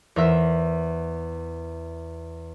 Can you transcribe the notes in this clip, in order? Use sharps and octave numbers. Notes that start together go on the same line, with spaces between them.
E2 A#4 C5 E5